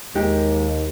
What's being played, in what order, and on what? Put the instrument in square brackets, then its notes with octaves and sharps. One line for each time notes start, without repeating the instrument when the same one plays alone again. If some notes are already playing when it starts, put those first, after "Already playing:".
[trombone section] D#2 [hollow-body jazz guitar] G#3 D#4 G4